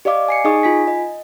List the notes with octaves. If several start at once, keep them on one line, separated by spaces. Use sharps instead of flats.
G4 D5 D#5 F5 D6
G#5 C7 C#7
D#4 G#4 D#5 G#5 C#6 D#6
F4 G#5 B6
D#5